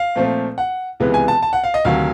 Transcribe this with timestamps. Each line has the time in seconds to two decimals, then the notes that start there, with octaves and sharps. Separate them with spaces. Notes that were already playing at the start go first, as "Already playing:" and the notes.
Already playing: F5
0.15 A#2 F3 A3 C4
0.58 F#5
1.00 C#2 C3 E3 G#3 B3
1.14 G#5
1.28 A5
1.42 A5
1.53 F#5
1.64 F5
1.74 D#5
1.85 D2 C3 D#3 F#3 F5